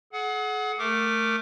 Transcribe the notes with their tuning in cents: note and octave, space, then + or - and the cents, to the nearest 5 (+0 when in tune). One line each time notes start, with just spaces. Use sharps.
G#4 +40 F#5 +0
A3 +0 A#4 -15 D6 +0